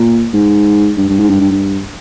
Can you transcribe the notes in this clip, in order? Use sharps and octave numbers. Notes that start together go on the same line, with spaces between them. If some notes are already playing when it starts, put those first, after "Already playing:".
Already playing: A#2
G#2
G2
G2
G#2
G2
G2
G2